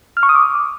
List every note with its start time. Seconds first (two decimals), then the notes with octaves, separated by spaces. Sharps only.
0.17 F6
0.23 C#6
0.29 D#6
0.35 D6